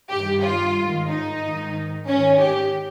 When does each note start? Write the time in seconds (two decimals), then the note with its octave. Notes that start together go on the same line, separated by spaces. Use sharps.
0.12 G2 D#3 G4
0.44 F4
0.77 G#2 D#3
1.10 D#4
1.43 G#2 D#3
2.08 G#2 D#3 C#4
2.41 G4